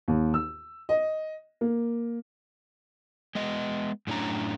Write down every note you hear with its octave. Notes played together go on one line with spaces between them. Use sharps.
D#2
E6
D#5
A#3
G#3 B3 D#5
F#2 A2 C#4 D4 A#5